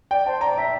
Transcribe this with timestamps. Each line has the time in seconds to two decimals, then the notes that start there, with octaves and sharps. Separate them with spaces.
0.11 D5 G5
0.26 C5 A5
0.41 D5 A#5
0.58 E5 A#5